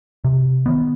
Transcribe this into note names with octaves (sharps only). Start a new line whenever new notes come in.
C3
D#3 B3